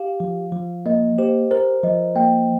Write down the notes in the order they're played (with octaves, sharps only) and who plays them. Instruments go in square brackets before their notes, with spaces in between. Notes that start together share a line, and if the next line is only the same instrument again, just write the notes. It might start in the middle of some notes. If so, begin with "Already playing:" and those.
Already playing: [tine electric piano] G4 [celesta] F5
[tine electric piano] F3
F3
[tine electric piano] A#3 [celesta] D#5
[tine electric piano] G4 [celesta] C5
[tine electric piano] A#4 [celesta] C5
[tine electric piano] F3 [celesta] D#5
[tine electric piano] A#3 [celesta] G5